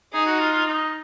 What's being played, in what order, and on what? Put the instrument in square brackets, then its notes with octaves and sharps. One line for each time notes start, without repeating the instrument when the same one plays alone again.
[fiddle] D#4 [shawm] G#4
[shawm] F#4
F4
F4
D#4